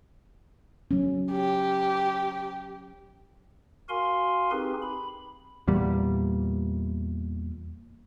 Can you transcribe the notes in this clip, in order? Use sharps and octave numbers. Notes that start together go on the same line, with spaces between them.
F#3 C#4
G4
F#4 A#4 F5 G#5 C6
C4 D#4 G4 G#4 B4
B5
E2 A#2 G3